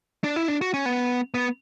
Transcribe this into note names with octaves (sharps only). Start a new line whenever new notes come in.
D4
E4
D4
F#4
C#4
B3
B3